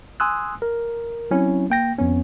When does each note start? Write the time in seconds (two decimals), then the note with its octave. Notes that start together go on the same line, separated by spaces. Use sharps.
0.20 G#5 C6 D#6 E6 F#6
0.62 A#4
1.31 F#3 C4 C#4 E4
1.70 A#3 G5 A#6
1.98 F2 B3 C#4